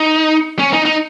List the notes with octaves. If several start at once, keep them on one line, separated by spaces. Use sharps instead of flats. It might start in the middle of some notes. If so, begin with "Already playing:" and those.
Already playing: D#4
C#4
D#4
D#4